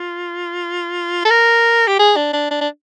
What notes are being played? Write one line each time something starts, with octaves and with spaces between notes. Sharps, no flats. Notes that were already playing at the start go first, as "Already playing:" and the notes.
Already playing: F4
A4
A#4
G4
G#4
D4
D4
D4
D4